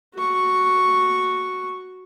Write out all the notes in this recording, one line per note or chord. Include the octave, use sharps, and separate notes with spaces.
F#4 C#6